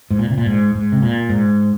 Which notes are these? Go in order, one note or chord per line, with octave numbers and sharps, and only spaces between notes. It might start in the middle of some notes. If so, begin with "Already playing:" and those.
G#2
A#2
C3
A#2
G#2
G#2
C3
A#2
G#2